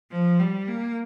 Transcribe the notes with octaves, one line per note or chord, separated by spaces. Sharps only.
F3
G3
A#3